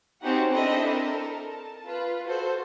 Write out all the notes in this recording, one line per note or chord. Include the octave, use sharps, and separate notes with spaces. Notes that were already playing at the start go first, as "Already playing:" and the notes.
C4 C#4 D#4 F#4 G4 F#5
C4 D4 E4 A4 D#5 B5
A4 A#4
A5
F4 B4
F#4 A4 C5